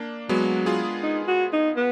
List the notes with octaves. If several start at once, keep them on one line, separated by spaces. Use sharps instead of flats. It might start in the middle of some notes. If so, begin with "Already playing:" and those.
Already playing: A#3 D4
F#3 G#3 B3
F4 G#4
D#4
F#4
D#4
B3